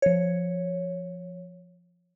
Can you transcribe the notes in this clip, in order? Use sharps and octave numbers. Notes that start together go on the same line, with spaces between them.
F3 C#5